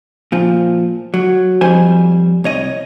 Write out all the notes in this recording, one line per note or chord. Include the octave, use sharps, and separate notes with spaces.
A#2 F3
F#3
F2 F3 G3 C5 G#5
C2 C#5 D#5